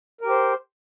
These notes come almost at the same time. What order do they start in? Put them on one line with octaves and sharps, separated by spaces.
A#4 G4 C5